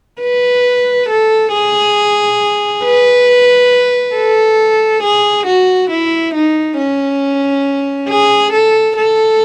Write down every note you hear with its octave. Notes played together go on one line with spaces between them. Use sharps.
B4
A4
G#4
B4
A4
G#4
F#4
E4
D#4
C#4
G#4
A4
A4